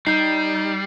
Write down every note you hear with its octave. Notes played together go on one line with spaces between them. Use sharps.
G3 D#4 G6 C7